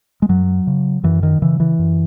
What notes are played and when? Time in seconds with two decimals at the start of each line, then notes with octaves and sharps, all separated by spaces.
0.22 G#3
0.29 F#2 F#3
0.67 C#3
1.03 F#2 E3
1.23 D#3
1.42 C#3 E3
1.60 E3
1.79 F#2